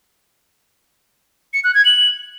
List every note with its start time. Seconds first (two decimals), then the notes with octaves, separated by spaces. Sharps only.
1.54 C#7
1.64 F#6
1.75 G#6
1.85 F#7